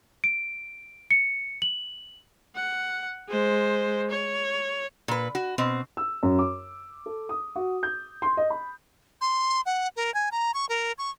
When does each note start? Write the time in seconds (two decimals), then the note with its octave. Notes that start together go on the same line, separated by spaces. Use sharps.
0.24 D7
1.11 C#7
1.62 F#7
2.55 F#5
3.29 G#3 C5
4.10 C#5
5.08 A#2 B4
5.35 F#4
5.58 B2 C4
5.97 E6
6.23 F#2
6.39 D6
7.06 A4
7.29 D#6
7.56 F#4
7.83 G6
8.22 C6
8.37 D#5
8.50 B5
9.21 C6
9.66 F#5
9.96 A#4
10.14 G#5
10.32 A#5
10.54 C#6
10.69 A#4
10.98 C#6